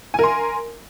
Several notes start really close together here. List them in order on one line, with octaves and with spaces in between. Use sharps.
G#5 A#4 C6